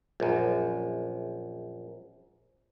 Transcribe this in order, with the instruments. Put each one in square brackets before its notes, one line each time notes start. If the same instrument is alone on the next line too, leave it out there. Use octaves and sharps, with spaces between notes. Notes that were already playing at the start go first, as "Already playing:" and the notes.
[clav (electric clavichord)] A#1 F#2